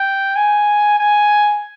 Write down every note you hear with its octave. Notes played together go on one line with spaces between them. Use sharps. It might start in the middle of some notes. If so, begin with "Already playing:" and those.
Already playing: G5
G#5
G#5